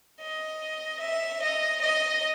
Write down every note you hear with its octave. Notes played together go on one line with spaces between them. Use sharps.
D#5
E5
D#5
D#5